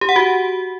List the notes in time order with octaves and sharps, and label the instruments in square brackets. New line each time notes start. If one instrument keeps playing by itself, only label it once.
[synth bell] G4
F#5
F#4